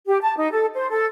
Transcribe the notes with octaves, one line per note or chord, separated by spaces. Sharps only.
G4
A5
D#4
A4
C5
A4